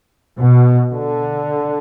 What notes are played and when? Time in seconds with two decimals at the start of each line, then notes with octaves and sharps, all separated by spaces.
0.39 B2
0.92 D3